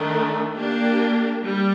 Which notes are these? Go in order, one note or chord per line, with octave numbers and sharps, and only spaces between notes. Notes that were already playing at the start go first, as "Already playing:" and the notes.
Already playing: D#3 A3 D4
A#3 D4 G4
G3